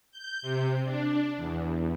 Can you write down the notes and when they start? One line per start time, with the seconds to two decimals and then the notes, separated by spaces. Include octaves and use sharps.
0.12 G6
0.42 C3
0.85 D4
1.37 E2